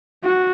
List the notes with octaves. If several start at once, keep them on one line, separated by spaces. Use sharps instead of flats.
F#4